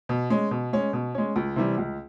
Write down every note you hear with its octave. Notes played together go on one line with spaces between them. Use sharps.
B2
G#3 C#4
B2
G#3 C#4
B2
G#3 C#4
C#2
C3 E3 G3
C#2